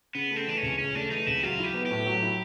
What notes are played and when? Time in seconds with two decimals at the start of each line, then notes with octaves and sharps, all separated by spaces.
0.15 C#3 B3
0.31 A3
0.36 C4
0.47 E3 D4
0.57 C#2 C#4
0.78 C#3 C#4
0.95 A3 D4
1.11 E3 D#4
1.27 C#2 E4
1.43 F#3 F4
1.59 E4 G4
1.74 B3
1.86 A2 G4
2.06 F#3
2.23 E4